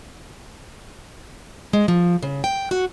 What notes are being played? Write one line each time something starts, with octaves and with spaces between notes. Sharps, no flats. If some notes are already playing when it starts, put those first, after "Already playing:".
G#3
F3
C#3
G5
F#4